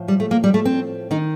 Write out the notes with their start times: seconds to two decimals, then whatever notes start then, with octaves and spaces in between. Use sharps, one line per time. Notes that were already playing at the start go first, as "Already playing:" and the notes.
Already playing: A2 F3
0.08 G3
0.20 A3
0.31 A#3
0.44 G3
0.54 A3
0.65 C4
1.11 D#3 D#4